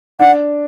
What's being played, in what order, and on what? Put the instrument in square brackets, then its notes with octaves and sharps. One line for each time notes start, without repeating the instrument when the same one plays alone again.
[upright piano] D4 [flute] F#5